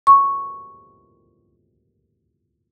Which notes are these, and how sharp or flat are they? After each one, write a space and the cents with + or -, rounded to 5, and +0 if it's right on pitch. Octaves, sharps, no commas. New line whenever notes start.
C#6 -5